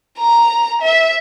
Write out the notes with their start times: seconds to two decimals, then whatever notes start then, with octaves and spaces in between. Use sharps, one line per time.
0.18 A#5
0.82 E5